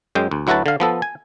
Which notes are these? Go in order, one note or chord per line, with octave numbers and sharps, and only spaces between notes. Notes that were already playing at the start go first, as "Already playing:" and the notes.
F#2 G#3 G5
D2
D2 F#3 E4 F#4 B4 A5
D3 F5
F3 B3 A4
G#5